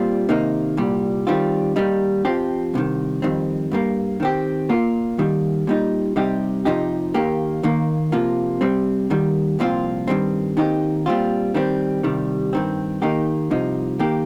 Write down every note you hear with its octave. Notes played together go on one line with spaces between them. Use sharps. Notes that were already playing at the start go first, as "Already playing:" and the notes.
Already playing: A#2 G3 C4 F4
C3 D#3 A#3 D#4
C2 A#2 G3
D#3 G3 C4 F4
D#2 D#3 G3 D#4
F2 F3 C4 G4
C2 C3 D#3
F2 D#3 G3 C4
G2 G3 A#3
D#3 C4 G4
A#2 A#3 F4
D#2 D#3 G3
A#2 G3 D#4
C3 G3 D#4 G4
F2 C3 F3 D#4 G4
D#2 D#3 A#3 G4
D#2 D#3 A#3
C3 F3 A#3 F4
C3 G3 C4
D#2 D#3 G3
C2 A#2 F3 C4 F4
G2 D#3 G3 C4
D#2 D#3 C4 D#4 G4
A#2 G3 C4 F4
D#3 G3 C4
C2 C3 D#3 G3
G2 D#3 C4
D#3 A#3 D#4 G4
C2 C3 F3 D#4
D#3 A#3 G4